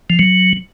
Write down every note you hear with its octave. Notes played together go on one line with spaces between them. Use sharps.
F3
F#3